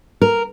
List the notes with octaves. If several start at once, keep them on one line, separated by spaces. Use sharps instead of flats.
A#4